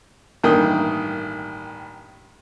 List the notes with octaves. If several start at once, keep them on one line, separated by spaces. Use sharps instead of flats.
A1 G2 D#3 A#3 G5 D#6